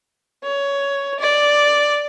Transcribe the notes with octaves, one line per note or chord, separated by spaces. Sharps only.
C#5
D5